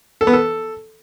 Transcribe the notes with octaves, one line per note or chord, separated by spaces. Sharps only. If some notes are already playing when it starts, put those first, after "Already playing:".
A4
B3
A4